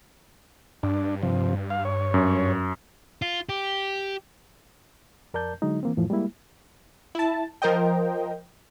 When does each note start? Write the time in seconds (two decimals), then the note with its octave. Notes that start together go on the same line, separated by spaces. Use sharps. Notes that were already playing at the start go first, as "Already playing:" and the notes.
0.83 G2 D4
1.23 C3 F3
1.70 F5
1.85 C#5
2.14 F#2
3.22 F4
3.49 G4
5.34 F2 A#4 D5 A5 G6
5.62 D3 F#3 G#3 D#4
5.83 E3 A#3 C4
5.97 F2 A2 E3 F3
6.10 G3 G#3 A#3 E4
7.15 E4 A5
7.62 F3 A#4 C5 D#5 G5